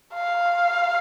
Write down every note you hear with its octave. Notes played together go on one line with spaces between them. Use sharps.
F5